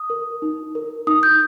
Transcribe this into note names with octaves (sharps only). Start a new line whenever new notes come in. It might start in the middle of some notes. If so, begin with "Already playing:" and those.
Already playing: D#6
A#4
D#4
A#4
D#4 D#6
G6